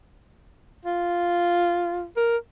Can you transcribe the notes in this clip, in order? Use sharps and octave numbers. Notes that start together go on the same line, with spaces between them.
F4
A#4